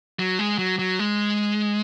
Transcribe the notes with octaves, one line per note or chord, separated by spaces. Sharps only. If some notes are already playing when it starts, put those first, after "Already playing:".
F#3
G#3
F#3
F#3
G#3